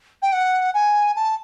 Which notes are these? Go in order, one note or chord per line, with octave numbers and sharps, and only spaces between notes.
G5
F#5
G#5
A5